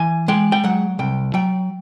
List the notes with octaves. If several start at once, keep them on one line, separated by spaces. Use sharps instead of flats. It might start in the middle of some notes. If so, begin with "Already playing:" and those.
Already playing: E3 G#5
G#3 G5
G5
F#3 F#5
C2 G5
F#3 G5